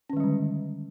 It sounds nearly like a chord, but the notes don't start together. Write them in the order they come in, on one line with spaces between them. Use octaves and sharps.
C#4 D#3 G#3 G3 D3